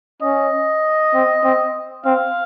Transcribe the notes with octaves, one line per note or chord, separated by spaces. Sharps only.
C#4 D#5
C4
C4
C4 F5